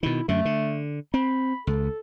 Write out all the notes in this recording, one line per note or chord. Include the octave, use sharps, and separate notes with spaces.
B2 D#3 E4
F#2 D3 A3
D3
C4 B5
C#2 A4